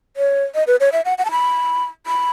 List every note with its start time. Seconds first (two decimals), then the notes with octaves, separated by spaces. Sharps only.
0.17 C#5
0.55 D#5
0.67 B4
0.80 C#5
0.92 E5
1.05 F#5
1.18 F#5
1.25 A5
1.31 B5
2.07 B5